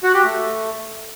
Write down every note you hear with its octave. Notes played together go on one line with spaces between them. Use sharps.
F#4
G4
A3